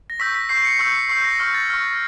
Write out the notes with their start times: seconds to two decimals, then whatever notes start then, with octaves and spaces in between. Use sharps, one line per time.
0.10 A#6
0.20 C#6 E6 G6 B6
0.35 B6
0.49 C#6 E6 G6 C7
0.65 C#7
0.79 C#6 E6 G6 C#7
0.95 C7
1.09 C#6 E6 G6 C7
1.24 A#6
1.40 C#6 F6
1.54 A6
1.70 C#6 F6